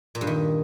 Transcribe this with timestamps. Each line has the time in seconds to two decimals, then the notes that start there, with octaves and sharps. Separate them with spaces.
0.15 A#2
0.21 G2
0.27 D#3